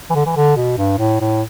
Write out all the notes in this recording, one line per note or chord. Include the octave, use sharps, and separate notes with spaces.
E3
D3
E3
D3
B2
G2
A2
A2